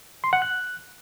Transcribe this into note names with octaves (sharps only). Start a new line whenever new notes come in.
C6
F#5
F#6